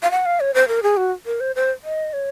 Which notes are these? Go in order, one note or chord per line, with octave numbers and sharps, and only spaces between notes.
F5
F#5
F5
C#5
C5
A#4
G#4
F#4
A#4
C5
C5
D#5
C#5